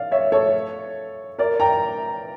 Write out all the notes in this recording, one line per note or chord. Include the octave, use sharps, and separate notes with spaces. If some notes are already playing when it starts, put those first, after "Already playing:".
Already playing: D5 F5
C#5 E5
A4 C#5
A#4 D5
G5 A#5